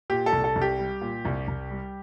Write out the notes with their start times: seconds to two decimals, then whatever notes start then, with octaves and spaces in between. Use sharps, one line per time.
0.10 A#2 G4
0.26 A4
0.32 C2
0.44 A4
0.56 C2
0.62 G4
0.79 G3
1.01 A#2
1.25 C2
1.48 C2
1.71 G3